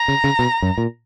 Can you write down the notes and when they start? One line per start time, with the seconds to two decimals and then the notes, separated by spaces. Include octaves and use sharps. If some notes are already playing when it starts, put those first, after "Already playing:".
Already playing: A#5
0.08 C#3
0.24 C#3
0.39 B2
0.62 F#2
0.78 A#2